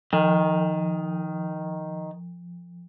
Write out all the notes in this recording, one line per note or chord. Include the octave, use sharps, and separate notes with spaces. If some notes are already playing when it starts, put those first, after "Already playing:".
D#3 F3